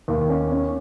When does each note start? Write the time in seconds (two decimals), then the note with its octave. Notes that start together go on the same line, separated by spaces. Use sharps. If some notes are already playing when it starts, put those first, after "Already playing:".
0.08 D#2
0.30 C#4
0.52 C#4